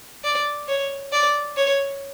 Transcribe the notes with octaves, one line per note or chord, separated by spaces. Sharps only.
D5
C#5
D5
C#5